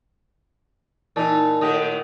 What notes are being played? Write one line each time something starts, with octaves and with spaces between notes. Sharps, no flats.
A#2 E3 D#4 A5
A2 D#3 G4 D#5 F#5